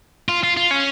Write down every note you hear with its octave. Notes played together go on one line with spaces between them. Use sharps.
F4
F4
F4
C#4